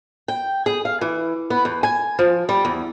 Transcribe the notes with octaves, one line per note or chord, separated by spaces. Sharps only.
G5
G#4
F5
E3
B3
E2
G#5
F3
G3
E2